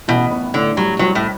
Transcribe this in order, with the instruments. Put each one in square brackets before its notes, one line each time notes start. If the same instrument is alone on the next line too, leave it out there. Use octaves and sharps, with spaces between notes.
[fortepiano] A1 [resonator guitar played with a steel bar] B2
[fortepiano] B3
[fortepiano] A2 [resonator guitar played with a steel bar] D3
[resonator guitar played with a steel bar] F#3 [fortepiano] G3
[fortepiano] C2 [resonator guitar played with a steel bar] F#3
[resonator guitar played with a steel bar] A2